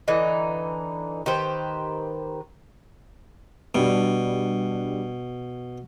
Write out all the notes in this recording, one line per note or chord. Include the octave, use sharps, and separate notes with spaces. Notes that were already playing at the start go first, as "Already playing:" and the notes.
D3 E3 D#4
D#3 G4 B4 C5
B2 G3 D4